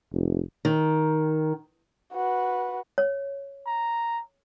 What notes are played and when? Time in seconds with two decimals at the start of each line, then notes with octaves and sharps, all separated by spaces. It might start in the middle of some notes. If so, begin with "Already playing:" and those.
0.13 F1
0.65 D#3
2.13 F#4 B4
2.98 C#5
3.66 A#5